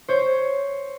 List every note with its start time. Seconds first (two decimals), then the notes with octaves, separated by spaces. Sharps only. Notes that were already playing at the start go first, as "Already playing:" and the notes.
0.08 C5 C#5